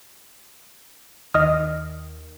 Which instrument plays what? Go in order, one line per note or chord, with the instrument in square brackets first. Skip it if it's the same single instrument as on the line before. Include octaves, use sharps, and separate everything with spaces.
[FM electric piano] D#2 D#3 [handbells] D#5 D#6 F6